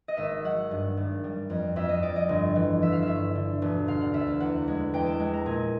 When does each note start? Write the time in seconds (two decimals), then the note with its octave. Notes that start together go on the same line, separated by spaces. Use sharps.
0.08 D#5
0.17 G#1 E5
0.44 F#3 F#5
0.71 G2
0.97 G#1
1.24 G3
1.50 F2
1.76 F2 E5
1.89 D#5
2.02 F2 D5
2.16 D#5
2.29 G1
2.55 E3
2.82 E3 E5
2.92 F5
3.03 E5
3.08 G2
3.35 D3
3.62 E1
3.88 D3 F5
4.01 F#5
4.14 D2 E5
4.28 F5
4.40 E2 F#5
4.68 G#3
4.94 E2 G5
5.06 A5
5.20 G#3
5.33 A#5
5.46 A#2 G#5